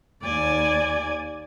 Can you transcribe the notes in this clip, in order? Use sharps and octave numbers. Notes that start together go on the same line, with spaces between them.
D#2 D5 G#5